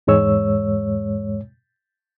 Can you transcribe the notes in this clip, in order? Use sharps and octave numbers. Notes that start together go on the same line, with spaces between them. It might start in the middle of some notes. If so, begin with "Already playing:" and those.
E2 G#2 G#3 C#5 E6